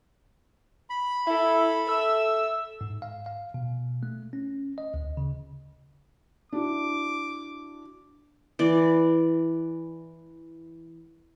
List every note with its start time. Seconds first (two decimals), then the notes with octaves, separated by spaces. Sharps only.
0.90 B5
1.27 E4 A4 E5
1.89 A4 E5 E6
2.81 G#2
3.02 F5
3.26 F5
3.54 B2
4.03 A3
4.33 C#4
4.78 D#5
4.94 D2
5.17 C#3
6.52 D4 E4 F#4 D6
8.59 E3 D5